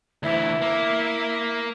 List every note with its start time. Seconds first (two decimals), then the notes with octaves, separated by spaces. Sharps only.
0.23 D2 E3 E4
0.62 A#3